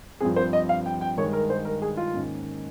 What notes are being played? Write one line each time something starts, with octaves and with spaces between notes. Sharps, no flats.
G2 F3 C4 G#4
C5
D#5
F5
G5
G5
G2 D#3 G#3 C#5
A#4
C5
A#4
G#4
F4
G#2 D#3 A#3 C#4